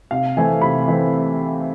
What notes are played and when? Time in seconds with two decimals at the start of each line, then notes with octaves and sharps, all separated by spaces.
0.11 C3 F5
0.37 E3 A3 C4 G#5
0.62 C3 B5
0.88 E3 A3 C4